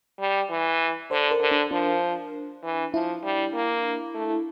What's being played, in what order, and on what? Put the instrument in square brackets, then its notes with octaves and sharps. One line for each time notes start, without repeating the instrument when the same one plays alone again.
[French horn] G3
E3
[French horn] D3 [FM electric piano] C5
[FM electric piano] A#4
[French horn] D3
[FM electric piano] D4
[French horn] F3 [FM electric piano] D4
[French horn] E3
[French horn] F3 [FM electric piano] E4
[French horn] G3
A#3
A3